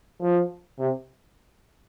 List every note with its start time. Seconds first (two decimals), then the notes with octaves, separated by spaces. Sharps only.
0.21 F3
0.78 C3